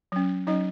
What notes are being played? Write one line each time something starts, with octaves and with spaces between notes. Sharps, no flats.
F#3 C#4
F#3 C#4 D#4 D#5